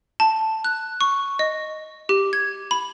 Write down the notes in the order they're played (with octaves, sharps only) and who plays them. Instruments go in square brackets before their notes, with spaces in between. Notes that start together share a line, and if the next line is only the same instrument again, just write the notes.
[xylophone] A5
F#6
C#6
D#5
G4
G#6
B5